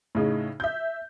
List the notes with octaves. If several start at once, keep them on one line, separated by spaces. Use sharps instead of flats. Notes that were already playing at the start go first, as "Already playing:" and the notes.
A2 C#3 D#4
E5 G6